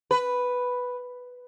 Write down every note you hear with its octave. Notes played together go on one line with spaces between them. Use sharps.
B4